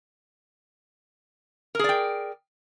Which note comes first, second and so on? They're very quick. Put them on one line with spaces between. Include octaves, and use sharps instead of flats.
A#4 G#4 D5 G5